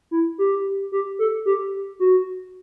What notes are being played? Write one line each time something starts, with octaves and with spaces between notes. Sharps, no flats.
E4
G4
G4
A4
G4
F#4